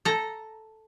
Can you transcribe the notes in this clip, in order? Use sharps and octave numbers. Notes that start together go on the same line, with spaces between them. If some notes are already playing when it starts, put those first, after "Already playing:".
A4 A#5